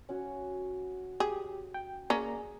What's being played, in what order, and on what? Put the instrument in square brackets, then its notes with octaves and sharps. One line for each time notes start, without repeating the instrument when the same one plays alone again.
[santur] C#4 F#4
[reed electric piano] G4 [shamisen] G#4
[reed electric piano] G5
[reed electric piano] A#3 D5 A#5 [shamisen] C#4 [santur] G#4